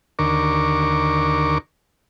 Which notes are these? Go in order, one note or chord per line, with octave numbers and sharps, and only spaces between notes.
D#2 D3 A#4 C#6 D6